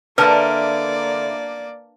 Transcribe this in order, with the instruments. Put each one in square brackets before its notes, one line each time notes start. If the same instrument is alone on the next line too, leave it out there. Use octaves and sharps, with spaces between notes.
[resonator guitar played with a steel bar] D3 [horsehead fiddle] A#3 D5 [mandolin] E4 A#4 [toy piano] B4